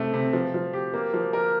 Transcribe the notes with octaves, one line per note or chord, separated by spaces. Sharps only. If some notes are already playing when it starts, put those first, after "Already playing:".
Already playing: C3 A3
C3
F3
F3
G4
A#3
F3
A#4